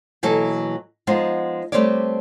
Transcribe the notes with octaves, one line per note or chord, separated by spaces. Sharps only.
B2 E3 F#3 A#3 E4 A4
F3 G#3 B3 D#4 C5
G3 A3 C4 B4 C#5 D5